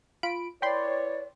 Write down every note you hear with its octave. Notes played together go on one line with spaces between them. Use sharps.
F4 B5 D7
E4 B4 C#5 D5 G5 B5 C6